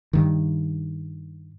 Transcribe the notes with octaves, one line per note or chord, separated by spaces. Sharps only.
G2 D#3